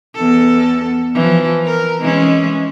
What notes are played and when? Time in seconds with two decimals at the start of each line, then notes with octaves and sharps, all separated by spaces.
0.14 E2 A4
1.14 E3 F3
1.65 A#4
2.01 E3 G#3 C#4